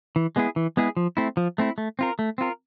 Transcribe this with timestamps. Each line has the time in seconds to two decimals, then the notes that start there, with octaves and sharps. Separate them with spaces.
0.16 E3
0.36 G#3 B3 E4 G#4
0.56 E3
0.77 G#3 B3 E4 G#4
0.97 F3
1.17 A3 C4 E4
1.37 F3
1.58 A3 C4 E4
1.78 A3
1.99 C4 F4 A#4
2.19 A3
2.38 C4 F4 A#4